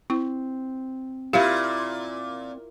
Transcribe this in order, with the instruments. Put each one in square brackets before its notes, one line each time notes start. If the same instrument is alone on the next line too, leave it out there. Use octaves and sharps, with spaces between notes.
[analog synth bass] C4 [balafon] E4
[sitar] A#2 [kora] E4 F4 [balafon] G4 F5